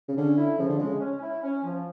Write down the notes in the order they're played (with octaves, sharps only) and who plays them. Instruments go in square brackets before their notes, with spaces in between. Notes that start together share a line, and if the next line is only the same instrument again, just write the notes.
[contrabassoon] C#3
[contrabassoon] D3 [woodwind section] C#4
[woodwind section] E4
[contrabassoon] C#3 [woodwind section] F3
[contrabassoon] D3
[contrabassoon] C#3 [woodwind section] G#3
[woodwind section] C#4
E4
C#4
F3